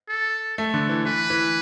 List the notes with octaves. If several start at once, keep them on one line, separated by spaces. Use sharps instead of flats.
A4
A3 A4
D3
E3
E3 B4
E3